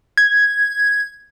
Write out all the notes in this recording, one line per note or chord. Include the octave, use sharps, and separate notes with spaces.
G#6